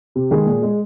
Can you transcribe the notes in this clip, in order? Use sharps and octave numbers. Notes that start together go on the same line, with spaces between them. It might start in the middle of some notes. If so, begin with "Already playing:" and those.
C3
D#3 G#3 G#4
A#2
G#3